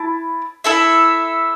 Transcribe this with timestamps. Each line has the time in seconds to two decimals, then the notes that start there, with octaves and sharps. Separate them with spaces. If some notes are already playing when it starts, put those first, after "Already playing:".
Already playing: E4 A5
0.64 E4 A4 E5